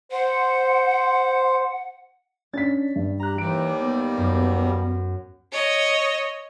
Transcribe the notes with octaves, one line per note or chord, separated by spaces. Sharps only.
C5 F#5
C#4 D4 A6 B6
G2
G4 A#5 F#6
D#2 E3 G3 D7
B3
F#2
C#5 D#5